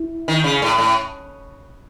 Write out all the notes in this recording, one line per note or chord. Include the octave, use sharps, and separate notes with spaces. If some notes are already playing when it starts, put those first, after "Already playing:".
Already playing: E4
D#3
C#3
A2
A2